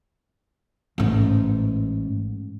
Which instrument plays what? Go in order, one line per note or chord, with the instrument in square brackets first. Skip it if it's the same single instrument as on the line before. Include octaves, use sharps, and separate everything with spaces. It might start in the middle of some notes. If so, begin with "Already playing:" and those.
[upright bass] A1 G#2